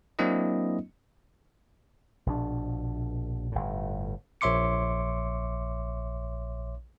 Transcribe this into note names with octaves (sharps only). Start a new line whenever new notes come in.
F#3 A#3 C4 D4 E4 D#5
A#1 B2 D4
G1 A2
A#1 C#5 E5 C6 D6 C#7